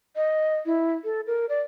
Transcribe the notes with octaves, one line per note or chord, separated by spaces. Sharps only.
D#5
E4
A4
A#4
D5